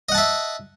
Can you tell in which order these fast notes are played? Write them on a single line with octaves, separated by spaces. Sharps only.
D#5 F#5 A5 E5